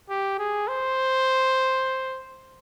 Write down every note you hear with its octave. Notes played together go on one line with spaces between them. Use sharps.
G4
G#4
C5